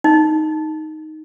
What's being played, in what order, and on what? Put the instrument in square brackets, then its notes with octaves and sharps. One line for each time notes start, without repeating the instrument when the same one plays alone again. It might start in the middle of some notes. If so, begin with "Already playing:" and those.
[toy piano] D#4